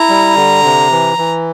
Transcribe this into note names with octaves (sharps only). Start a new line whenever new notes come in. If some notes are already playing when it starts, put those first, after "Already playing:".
Already playing: E4 A#5
G3
D3
C3
E3
E3